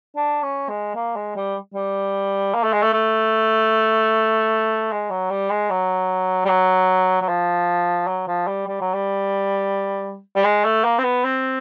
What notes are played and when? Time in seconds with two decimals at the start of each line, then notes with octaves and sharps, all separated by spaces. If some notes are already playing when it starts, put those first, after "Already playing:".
0.16 D4
0.43 C#4
0.69 G#3
0.95 A#3
1.16 G#3
1.36 G3
1.74 G3
2.54 A#3
2.63 A3
2.73 G#3
2.82 A3
2.93 A3
4.92 G#3
5.10 F#3
5.31 G3
5.51 G#3
5.70 F#3
6.45 G3
6.49 F#3
7.22 F#3
7.28 F3
8.07 F#3
8.27 F3
8.47 G3
8.67 G3
8.81 F#3
8.94 G3
10.36 G3
10.45 G#3
10.65 A3
10.84 A#3
10.98 C4
11.04 B3
11.24 C4